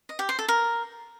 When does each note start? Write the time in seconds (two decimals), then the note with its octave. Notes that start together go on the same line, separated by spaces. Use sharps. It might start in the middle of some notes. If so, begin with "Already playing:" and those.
0.09 D#5
0.19 G4
0.29 C5
0.39 A4
0.48 A#4